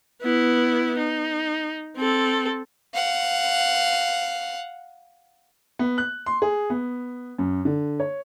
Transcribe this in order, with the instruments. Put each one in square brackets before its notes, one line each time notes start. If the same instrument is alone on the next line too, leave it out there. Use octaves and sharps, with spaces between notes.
[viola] B3 E4
D#4
C4 A4
[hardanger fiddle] F5 F#5
[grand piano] B3
F#6
C6
G#4
B3
F#2
D3
C#5